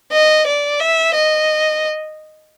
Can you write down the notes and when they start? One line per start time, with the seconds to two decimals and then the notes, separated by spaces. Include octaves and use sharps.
0.12 D#5
0.46 D5
0.80 E5
1.15 D#5